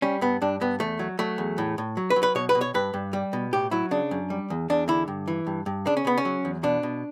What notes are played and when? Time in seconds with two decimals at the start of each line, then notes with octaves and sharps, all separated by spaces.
0.02 G3 C#4
0.21 G2 B3
0.42 G2 D4
0.61 G2 B3
0.80 E2 A3
0.99 F#3
1.19 F#3 A3
1.38 E2
1.58 A2
1.78 A2
1.97 F#3
2.10 B4
2.16 F#3
2.23 B4
2.35 B2 C#5
2.49 B4
2.55 B2
2.61 C#5
2.74 G2 B4
2.94 G2
3.13 G3
3.33 B2
3.53 A2 G4
3.71 F#3 E4
3.91 C#3 D4
4.11 F#2
4.30 G3
4.50 E2
4.70 E2 D4
4.88 D3 E4
5.08 G2
5.28 E3
5.47 G2
5.66 G2
5.86 C#3 D4
5.97 C#4
6.05 C#3 B3
6.17 C#4
6.25 F#3
6.45 E2
6.63 B2 D4
6.83 B2